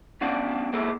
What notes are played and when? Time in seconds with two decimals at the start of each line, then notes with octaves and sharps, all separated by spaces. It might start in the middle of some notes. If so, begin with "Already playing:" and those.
0.21 G3 B3 C#4 D4 F5 F#5
0.73 A#3 B3 E4 G#4 A4